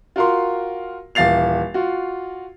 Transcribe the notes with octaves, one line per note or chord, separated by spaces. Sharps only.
F4 F#4 A#4 F5 C6
D#1 E3 F5 A6 C7 F7
F4 F#4